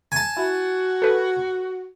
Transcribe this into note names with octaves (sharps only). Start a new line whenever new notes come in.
G#5 A5
E4 F#4
A4 B4